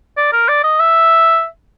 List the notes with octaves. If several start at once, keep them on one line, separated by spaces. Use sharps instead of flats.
D5
A#4
D5
D#5
E5